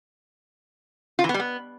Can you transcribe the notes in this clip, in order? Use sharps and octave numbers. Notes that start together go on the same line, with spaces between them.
F4
E3
B3
G3
B3